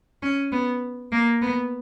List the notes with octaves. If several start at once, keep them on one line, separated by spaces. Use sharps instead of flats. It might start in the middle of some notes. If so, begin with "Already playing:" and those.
C#4
B3
A#3
B3